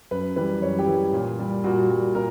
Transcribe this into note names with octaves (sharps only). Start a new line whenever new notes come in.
F#2 B4
E3 G3 B4
F#2 C#5
G4
E3 G3
A#2
G3
A#2 F#4
G3 F#4
A#2 A#4